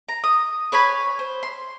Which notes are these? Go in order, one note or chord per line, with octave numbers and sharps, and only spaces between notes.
A#5
D#6
B4 C#5 G#5 B5
C5
C6